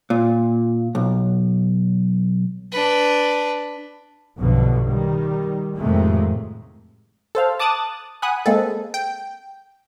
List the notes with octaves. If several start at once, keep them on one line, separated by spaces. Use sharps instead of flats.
A#2
B1
D4 B4
B1 G2 B2 D3 F3
D#3 G3
F2 A2 C3 D#3 G#3 A3
A4 C5 F5
A5 D6 D#6 F#6 A6
F#5 G#5 B5 D#6 F#6
G#3 A#3 C4 G#4 A4
G5